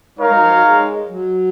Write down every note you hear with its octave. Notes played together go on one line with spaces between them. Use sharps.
G#3 D#4 A#4 C#5 F5
F#3
F3
F#3
G#3
F#3